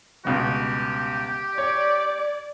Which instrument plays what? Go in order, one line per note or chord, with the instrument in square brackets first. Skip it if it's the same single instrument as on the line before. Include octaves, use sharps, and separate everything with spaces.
[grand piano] G1 C#2 B2 [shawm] G4
[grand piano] C#5 [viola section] D5